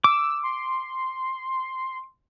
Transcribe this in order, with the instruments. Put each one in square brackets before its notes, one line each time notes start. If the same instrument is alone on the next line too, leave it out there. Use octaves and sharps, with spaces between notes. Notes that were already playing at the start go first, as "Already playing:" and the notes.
[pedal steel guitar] D6 [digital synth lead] E6
[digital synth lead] C6